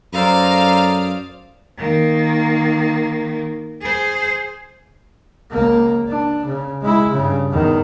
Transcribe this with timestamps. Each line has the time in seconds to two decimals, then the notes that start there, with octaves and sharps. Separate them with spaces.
0.13 F#2 A4 C5 D5 F5 A#5 D#6
1.77 D#3 A#3
3.81 G#4 C5
5.51 C#2 A#3
6.08 D4
6.46 C#3
6.82 G#3 E4
7.12 G2 C#3
7.51 E2 D#3